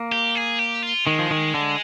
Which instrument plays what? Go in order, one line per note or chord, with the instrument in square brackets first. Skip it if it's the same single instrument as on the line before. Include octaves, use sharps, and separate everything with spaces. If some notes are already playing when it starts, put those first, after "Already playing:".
Already playing: [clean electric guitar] A#3
[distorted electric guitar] G4
G#4
G4
F4
[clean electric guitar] D#3 [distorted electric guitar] G#3
[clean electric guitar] F3
D#3
D3